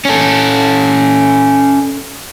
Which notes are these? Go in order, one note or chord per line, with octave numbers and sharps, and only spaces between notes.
C#4 A4